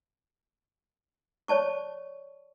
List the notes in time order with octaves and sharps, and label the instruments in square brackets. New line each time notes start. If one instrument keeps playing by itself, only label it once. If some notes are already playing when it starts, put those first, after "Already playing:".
[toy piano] C#5 D5 A5 C#6